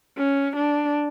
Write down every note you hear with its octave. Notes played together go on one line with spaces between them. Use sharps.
C#4
D4